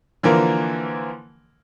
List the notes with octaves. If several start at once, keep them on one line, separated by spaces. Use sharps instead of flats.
D3 E3 F3 A#3 A#4